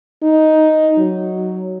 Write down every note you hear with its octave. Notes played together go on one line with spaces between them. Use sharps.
D#4
F#3